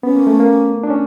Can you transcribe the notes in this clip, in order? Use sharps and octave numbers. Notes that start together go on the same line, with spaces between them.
B3 C#4
A#3
A3
A#3
D4
C#4